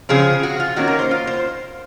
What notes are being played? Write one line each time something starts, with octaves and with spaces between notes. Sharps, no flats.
C#3 F3 C4 G#4
F#4
F4
D#3 A#3 C#4 F#4
A#4
C5
F4
C5